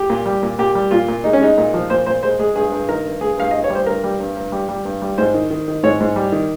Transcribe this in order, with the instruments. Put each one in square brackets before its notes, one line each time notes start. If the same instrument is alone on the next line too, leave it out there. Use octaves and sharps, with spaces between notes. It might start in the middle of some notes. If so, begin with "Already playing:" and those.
Already playing: [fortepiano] G4
A#2
G3
A#2
A#2 G4
G3
A#2 F4
A#2
G#3 D#4
C#4
G#3 D#4
A#2
F3
A#2 C5
A#2 C5
G#3 C5
G#3 G#4
G2 G#4
G2
D#3 A#4
G2
G2 G#4
G2 F5
G2 D#5
C#5
G3
C5
G2 A#4
G3
G2
G2
G3
G3
G2
G3
G#2 C5
D#3
D#3
D#3
G#2 C#5
G#2
G3
D#3